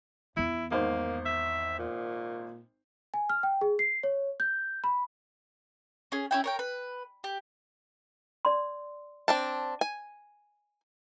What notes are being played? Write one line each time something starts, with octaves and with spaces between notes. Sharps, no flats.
E2 B3 E4
G#1 A#3 C5
E5
A#2
G#5
F6
G5
G#4
C7
C#5
G6
B5
C#4 G#4
C#4 E4 G5
A#4 C#5 G5
B4
G4
D5 C6
C4 D4 A5
G#5